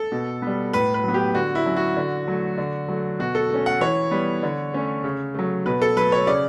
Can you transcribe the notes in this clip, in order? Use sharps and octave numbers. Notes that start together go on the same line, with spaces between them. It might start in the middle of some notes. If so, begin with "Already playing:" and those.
Already playing: A4
B2
G3 B3
A2 B4
B4
F#3 B3
G4
D3 F#4
E4
F#3 C#4
F#4
D3
F#3 A3
D3
F#3 A3
B2 F#4
A4
A3 C#4
F#5
E3 C#5
G3 B3
D3
A3 C#4
C#3
F#3 A3
B2 B4
A4
F#3 A3 B4
C#5
C#3 D5